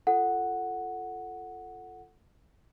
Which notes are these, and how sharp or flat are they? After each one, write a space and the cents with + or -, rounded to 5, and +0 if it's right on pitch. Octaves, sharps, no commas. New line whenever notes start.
F4 -10 A4 +0 F#5 +0